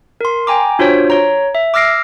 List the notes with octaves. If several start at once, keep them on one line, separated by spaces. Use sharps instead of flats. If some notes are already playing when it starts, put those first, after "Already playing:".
A#4 C6
G5 G#5 A#5 D6
D4 F4 F#4 C5 C#5
C#5 A#5
E5
D6 E6 F6 A#6 C7 D7